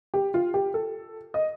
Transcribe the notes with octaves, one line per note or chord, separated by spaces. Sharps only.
G4
F4
G4
A4
D#5